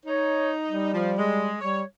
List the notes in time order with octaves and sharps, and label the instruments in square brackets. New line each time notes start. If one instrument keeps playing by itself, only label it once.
[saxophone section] D#4 [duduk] C#5
[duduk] G3
[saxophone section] F3
G#3
[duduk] G3 [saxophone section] C#5